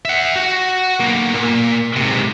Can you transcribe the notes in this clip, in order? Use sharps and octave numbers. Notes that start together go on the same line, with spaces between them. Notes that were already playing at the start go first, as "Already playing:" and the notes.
E5 F#5
F#4
B1 A#3
A#2
G#2 C3